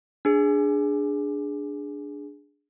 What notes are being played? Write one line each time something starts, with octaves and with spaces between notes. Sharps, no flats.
D4 G#4